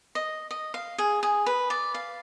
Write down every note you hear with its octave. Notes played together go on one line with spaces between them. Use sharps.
D#5
D#5
F5
G#4
G#4
B4
D5
F5